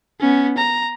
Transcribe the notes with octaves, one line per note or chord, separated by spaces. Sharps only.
B3 C#4
A#5